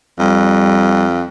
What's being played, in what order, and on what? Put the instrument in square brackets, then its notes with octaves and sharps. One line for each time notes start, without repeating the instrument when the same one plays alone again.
[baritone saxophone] F2 [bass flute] G3